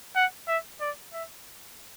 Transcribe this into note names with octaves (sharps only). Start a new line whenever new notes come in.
F#5
E5
D5
E5